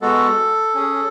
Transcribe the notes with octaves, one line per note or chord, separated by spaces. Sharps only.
G#3 B3 F#4 A4
C#4 G#4